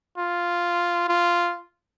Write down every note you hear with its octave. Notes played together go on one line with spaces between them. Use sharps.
F4
F4